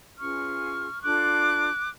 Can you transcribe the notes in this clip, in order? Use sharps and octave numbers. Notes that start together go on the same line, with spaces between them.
C#4 F4 G#4 B4 C#6 F6
D4 F4 A4 D6 F#6